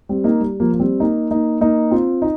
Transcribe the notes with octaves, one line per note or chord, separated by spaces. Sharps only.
G3 C4
A#3 D#4
G3
F3 A#3
A#3
G3 C4
A#3 D#4
A#3 D#4
A#3 D#4
C4 F4
D#4